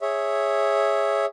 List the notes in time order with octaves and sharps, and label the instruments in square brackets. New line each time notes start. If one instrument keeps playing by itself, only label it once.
[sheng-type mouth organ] G#4 C#5 E5